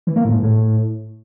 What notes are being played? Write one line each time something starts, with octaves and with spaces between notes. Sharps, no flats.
E3
A#3
A2
G#2
A2